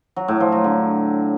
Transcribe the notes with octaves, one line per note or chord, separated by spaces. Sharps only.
F#3
A2
F3
F#3
D3